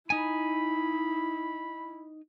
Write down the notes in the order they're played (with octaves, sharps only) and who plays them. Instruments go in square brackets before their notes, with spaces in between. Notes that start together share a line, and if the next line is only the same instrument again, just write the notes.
[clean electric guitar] D#4 G#5 [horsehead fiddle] E4 [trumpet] B5